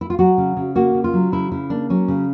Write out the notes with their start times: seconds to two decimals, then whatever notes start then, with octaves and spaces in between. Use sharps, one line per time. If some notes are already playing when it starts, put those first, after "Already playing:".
0.01 E4
0.10 F4
0.19 F#3 F#4
0.38 C#3
0.57 C#3
0.75 A#3 F#4
0.94 C#3
1.04 F4
1.13 F#3
1.32 C#3 E4
1.52 C#3 E4
1.70 A#3 D4
1.90 F#3 C#4
2.08 C#3